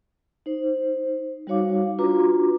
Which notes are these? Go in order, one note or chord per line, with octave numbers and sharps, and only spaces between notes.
D#4 C5
G3 D#4 F#4 C#5 F5 D6
D4 F4 F#4 B4 A#5 D6